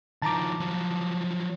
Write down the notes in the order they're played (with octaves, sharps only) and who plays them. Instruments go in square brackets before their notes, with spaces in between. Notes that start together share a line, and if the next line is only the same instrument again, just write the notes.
[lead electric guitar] D#3 F3 [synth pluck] A5 A#5 D6
[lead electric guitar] F3 F#3